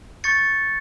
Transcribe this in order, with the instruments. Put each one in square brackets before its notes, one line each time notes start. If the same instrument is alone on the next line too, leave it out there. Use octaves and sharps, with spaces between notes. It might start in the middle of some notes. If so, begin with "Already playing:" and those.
[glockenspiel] C#6 G6 A6 C#7